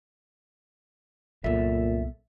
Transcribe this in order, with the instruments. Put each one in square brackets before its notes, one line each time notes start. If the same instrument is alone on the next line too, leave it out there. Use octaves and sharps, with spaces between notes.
[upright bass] C2 B3 [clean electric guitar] F#2 A4 E5 [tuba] A#2